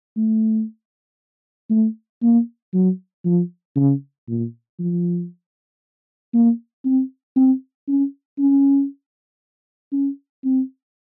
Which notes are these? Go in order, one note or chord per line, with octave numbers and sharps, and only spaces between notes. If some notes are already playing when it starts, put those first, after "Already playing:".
A3
A3
A#3
F#3
F3
C#3
A#2
F3
A#3
C4
C4
C#4
C#4
C#4
C4